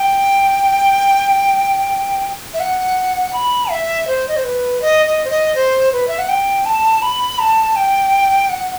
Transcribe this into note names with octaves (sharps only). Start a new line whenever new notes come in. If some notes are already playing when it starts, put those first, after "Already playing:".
Already playing: G5
E5
F#5
B5
E5
C5
D#5
C5
B4
D#5
D#5
C5
D#5
C5
B4
E5
F#5
G5
A5
B5
A5
G5
F#5